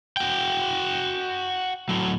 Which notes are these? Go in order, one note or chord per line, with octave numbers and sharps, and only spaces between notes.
F#4 G5
A2 F#3